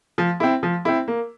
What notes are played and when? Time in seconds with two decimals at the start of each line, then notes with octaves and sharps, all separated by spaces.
0.18 F3
0.40 C4 E4
0.63 F3
0.85 C4 E4
1.08 A#3